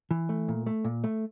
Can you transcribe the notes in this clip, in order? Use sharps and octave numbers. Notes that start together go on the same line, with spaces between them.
E3
A3
A#2
A3
A#2
A3